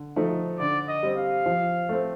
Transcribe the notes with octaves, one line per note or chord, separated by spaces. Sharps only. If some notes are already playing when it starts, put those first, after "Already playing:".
Already playing: D3
F3 A3 D#4
D3 D5
D#5
G3 C4
F5
F3
A3 C4